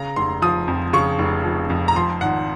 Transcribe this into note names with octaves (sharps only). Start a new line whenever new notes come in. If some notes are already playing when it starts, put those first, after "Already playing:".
Already playing: C#3 A#5
F1 C6
F3 D#6
F2
C#3 C#6
F1
F3
F2
A#5
F3 C6
G#1 F#5